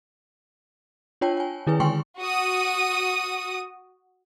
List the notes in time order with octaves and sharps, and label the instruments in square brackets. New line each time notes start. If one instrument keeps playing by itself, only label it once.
[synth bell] D4 F4 C#5 G5 A5
G5 G#5
D#3 E4 G#4 B4 G#5
D3 G#3 G5 G#5 C6 C#6
[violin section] F#4 D#6